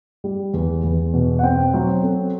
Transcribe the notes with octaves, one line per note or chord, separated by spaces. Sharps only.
G3
E2
E2
B2
F#5
C4 G5
F#3 C5
C4 A4